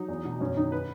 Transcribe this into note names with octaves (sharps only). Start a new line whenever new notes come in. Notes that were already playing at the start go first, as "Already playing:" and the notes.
Already playing: F#3 D#4
E2
B2
F#2 C#4
D#3 D#4
B4